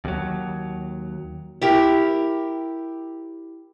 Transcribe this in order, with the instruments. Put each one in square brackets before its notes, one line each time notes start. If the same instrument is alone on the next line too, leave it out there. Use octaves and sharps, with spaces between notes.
[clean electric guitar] D#2 F#3
[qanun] E4 G4 A#4